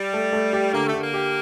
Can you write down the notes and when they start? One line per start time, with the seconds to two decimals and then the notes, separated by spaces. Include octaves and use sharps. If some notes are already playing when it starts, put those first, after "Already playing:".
Already playing: G3
0.13 A3
0.33 A3
0.53 G4
0.73 D3 A#3
0.86 A3
0.93 D3
1.00 A#3
1.14 G4